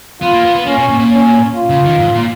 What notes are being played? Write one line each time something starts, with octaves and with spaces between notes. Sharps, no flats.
B3 F4
A#3
B3
B3
A#3 C#4
B2
A#2
A#2
C#4
F4
C#3
D#3
G#2
A#2